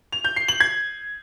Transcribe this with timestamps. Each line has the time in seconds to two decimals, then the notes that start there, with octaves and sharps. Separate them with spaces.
0.12 F7
0.24 G6
0.36 C7
0.48 F#7
0.60 G#6